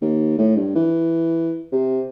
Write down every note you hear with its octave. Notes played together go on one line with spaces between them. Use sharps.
D#2
A2
G2
E3
C3